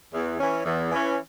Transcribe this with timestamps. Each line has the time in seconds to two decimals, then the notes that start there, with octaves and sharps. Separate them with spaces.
0.14 E2
0.39 E3 C#4
0.65 E2
0.92 E3 C#4